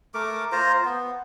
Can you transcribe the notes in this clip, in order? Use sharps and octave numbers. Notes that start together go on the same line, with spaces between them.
A3 A#4 D6
F4 C5 A#5
B3